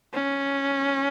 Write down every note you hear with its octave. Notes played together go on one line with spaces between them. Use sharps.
C#4